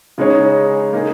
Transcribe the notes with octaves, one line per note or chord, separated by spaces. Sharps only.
C#3 G#3 D#4 G#4 C#5
A#3 D#4 G#4